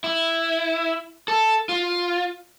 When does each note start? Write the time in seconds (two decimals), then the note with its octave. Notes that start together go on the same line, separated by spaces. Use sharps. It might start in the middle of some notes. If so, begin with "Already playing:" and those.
0.04 E4
1.28 A4
1.69 F4